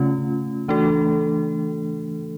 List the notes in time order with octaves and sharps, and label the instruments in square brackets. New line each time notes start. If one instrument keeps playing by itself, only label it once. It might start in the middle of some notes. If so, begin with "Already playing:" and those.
Already playing: [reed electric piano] C#3 [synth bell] A3 C#4 F4
[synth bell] E3 A3 D4 F#4 A4